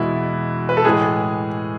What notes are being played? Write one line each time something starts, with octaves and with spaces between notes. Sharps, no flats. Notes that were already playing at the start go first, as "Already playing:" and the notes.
Already playing: E2 B2 G#3 E4 F#4
B4
A4
A2 E3 G#3 G#4